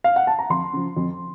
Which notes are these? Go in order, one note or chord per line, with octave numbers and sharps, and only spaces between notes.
F5
F#5
A5
A#5
F2 C6
C#3 F3
F2